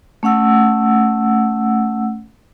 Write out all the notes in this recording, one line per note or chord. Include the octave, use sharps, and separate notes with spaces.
A3 C#4 F#5 E6